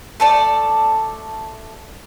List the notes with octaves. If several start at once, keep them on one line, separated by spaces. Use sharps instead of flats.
A3 A4 D5